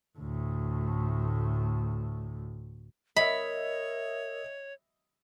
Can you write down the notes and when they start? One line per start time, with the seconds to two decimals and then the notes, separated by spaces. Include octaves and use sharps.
0.19 D2 A2
3.16 A#4 C#5 D#5 E5 B5